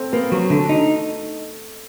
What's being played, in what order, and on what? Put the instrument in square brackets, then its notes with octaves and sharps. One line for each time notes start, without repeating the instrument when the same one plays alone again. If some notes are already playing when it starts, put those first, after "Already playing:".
Already playing: [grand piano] A3 C4
[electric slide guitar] A#3 [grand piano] B3
[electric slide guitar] F#3
[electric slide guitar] D3 [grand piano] A3
[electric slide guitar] D#4